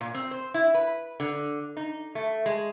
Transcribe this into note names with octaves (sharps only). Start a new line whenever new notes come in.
A#2
C4
C5
E4
B4
D3
D#4
A3
G#3